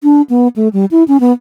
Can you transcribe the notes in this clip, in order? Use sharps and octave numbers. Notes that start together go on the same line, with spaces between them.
D4
B3
A3
G3
E4
C#4
B3